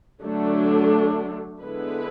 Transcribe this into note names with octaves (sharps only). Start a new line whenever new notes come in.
D3 F#3 A3 D4
D3 G#3 B3 E4 B4